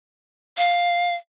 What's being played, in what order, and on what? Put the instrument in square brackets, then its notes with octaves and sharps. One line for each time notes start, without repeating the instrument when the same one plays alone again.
[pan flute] F5